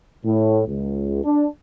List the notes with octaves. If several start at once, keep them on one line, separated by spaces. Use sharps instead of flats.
A2
C#2
D4